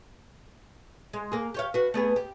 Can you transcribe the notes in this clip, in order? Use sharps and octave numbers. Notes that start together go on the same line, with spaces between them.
G#3
A#3 G#4
G4 C#5 F5
F#4 B4
A3 B3 G#4
G4